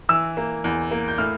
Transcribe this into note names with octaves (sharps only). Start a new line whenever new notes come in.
E3 E6
A#3
E2
A#3
G6
A2 F6